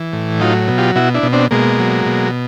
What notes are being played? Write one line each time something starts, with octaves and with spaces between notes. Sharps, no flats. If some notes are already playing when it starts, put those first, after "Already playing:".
Already playing: E3
A2
F#3 D#4 F4
B2
F4 G4
B2 E4 F#4
D4 E4
B2
C4 D4
B2 G#3 A#3
F#3
B2